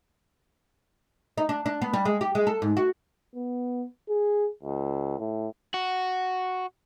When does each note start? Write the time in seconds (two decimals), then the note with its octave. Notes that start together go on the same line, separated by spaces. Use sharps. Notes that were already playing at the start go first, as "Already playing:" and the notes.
1.38 D#4
1.49 D4
1.66 D4
1.82 B3
1.94 G3
2.05 G#3
2.21 G4
2.35 G#3
2.47 A4
2.62 G#2
2.77 F#4
3.36 B3
4.09 G#4
4.63 C#2
5.19 A2
5.74 F#4